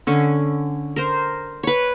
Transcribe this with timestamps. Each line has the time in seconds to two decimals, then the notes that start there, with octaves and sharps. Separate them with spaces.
0.07 D3 C#4
0.96 A#4 C5
1.63 B4 C#5